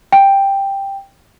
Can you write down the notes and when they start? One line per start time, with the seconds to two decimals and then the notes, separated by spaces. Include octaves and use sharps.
0.12 G5